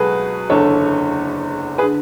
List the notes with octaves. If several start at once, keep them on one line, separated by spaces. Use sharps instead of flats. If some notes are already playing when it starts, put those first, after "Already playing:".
Already playing: C#2 B2 F#3 F#4 G#4 A4 B4
F#1 E2 D3 A4 C#5
G#4 B4
D3